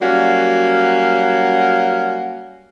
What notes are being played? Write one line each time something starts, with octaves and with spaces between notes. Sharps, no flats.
F#3 G3 A#3 C#4 F#4